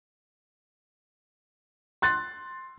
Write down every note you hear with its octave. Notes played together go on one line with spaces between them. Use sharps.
C6 F#6 A6